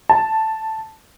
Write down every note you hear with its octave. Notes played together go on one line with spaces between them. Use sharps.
A5